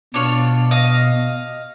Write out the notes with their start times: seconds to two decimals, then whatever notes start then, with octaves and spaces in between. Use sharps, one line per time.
0.14 B2 D4 F4 C#5
0.71 D#5 F5